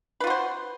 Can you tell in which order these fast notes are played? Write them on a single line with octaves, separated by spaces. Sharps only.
B4 F4 F#4 C5